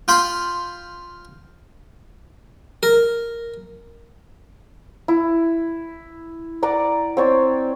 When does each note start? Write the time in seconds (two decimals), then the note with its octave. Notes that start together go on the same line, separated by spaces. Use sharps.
0.08 F4 G5 B5 C6
2.83 A#4
5.08 E4
6.63 D5 F#5 A#5 D6
7.17 C4 C#5 D5